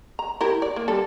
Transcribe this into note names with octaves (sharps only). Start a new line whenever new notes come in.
A#5
E4 G4 A#4
D5
A#3
D3 G3 A4